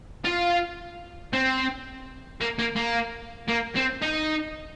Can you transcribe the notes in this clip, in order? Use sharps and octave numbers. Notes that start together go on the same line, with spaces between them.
F4
C4
A#3
A#3
A#3
A#3
C4
D#4